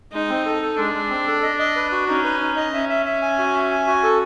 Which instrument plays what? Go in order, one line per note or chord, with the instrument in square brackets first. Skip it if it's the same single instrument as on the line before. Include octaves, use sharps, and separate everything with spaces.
[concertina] G#3 [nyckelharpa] D#4
[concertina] C4
A4
A4
[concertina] G#3 [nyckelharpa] D4
[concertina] G#3
C4
A4
D#5
D#5
B4
F#4
[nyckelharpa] C#4 [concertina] D#4
[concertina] B4
D#4
D#5
[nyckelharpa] C#4 [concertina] E5
[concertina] E5
E5
G#5
F#4
E5
G#5
F#4
A4